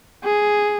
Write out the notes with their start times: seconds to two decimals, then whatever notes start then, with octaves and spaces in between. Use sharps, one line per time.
0.24 G#4